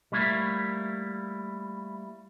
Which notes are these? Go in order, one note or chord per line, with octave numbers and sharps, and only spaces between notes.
G3 A3 A#3 E4